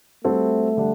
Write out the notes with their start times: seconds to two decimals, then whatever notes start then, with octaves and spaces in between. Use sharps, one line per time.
0.24 G3 A3 C4 F#4 A4
0.77 D3 G3 D4